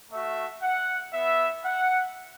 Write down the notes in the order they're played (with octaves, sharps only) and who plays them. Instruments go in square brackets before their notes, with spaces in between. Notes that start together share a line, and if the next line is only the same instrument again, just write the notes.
[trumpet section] A3 F#4 E5
F#5
B3 E4 E5
F#5